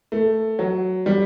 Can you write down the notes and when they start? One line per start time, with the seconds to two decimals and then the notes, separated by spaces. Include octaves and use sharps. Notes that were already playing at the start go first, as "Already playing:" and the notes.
0.12 A3
0.59 F#3
1.06 G3